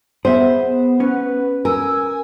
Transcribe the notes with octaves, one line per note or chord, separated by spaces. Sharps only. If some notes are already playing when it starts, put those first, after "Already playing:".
B3 G#4 C5 E5
C#4 B4
A#4 G#5 E6